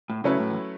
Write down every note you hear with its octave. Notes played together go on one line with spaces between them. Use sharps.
A2
C#3 F#3 A3 C#4 E4 B4
A2
E2